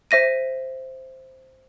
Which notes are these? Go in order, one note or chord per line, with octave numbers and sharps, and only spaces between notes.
C5 E5 A#6 D#7